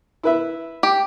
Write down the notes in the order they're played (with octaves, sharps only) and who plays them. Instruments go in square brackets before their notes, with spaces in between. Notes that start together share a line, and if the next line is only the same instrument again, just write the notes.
[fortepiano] E4 B4 E5
[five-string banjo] G4